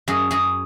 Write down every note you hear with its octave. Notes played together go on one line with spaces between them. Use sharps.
F#2 G#4
F#2 G#4